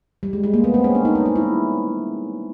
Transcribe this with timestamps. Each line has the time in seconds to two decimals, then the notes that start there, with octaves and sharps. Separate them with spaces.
0.23 G3
0.33 G#3
0.44 G#3
0.54 A#3
0.64 B3
0.74 C4
0.84 C#4
0.95 D4
1.05 D#4
1.15 C#4
1.25 D#4
1.36 E4